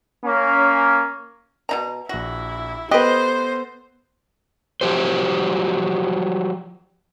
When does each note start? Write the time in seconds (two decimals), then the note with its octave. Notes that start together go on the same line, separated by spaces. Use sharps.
0.25 A#3 C#4
1.69 B2 D#4 A#5
2.09 A#1 E4 F#4 A#6
2.91 B3 G4 A4 B4 C5 D#5 F#6
4.81 F3 F#3 G4 C5